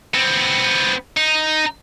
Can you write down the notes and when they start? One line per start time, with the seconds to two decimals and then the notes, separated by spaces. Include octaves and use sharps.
0.14 B3 C4
1.17 D#4